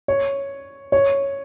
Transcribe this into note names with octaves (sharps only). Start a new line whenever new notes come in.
C#5
C#5